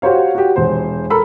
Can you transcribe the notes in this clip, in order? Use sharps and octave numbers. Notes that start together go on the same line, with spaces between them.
F#4 G4 C5 C#5 F5
F#4 G4
E1 C5
A4 A#4 B5 E6